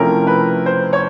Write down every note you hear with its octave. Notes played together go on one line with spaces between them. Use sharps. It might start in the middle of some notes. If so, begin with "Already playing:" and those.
Already playing: C3 F3 A3 C#4 E4 A#4
B4
C5
C#5